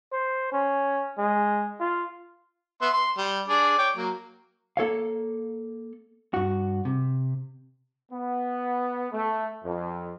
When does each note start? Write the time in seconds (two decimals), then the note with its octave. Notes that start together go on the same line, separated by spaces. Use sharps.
0.12 C5
0.52 C#4
1.18 G#3
1.80 F4
2.82 B3 E5 C6
2.94 C6
3.18 G3
3.48 D4 G#4 D5
3.78 C#5 G5 D6
3.96 F#3 A#3
4.77 A#3 A4 C#5 F5
6.34 G2 F#4
6.85 C3
8.12 B3
9.12 A3
9.64 F2